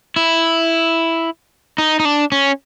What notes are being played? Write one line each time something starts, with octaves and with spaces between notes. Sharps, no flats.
E4
D#4
D#4
D4
C#4